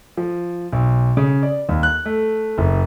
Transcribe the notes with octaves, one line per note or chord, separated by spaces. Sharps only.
F3
B1
C#3
D5
D#2
F#6
A3
F#1